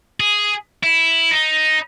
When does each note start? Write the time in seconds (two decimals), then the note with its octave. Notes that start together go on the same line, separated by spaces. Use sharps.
0.20 G#4
0.83 E4
1.31 D#4